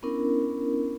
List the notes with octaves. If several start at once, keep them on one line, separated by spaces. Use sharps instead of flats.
B3 C#4 D4 E4 A#4